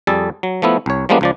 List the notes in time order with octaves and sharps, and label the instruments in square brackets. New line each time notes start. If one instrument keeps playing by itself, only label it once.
[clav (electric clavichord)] F2 G3 G#4 A4 A5
F#3
F3 A3 B3 E4
C2 C#5
F3 G3 G#3 A#3 B3 D4
C#2 F3 D5